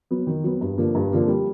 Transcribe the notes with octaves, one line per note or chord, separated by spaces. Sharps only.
F#3 B3
D#3
F#3 B3
G2
D3 F3 A#3
G2
D3 F3 A#3
G3